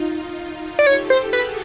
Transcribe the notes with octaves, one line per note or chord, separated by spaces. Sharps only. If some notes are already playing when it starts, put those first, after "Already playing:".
Already playing: D#4 F4
D5
G4 A4 C#5
C5
F#4 G#4 B4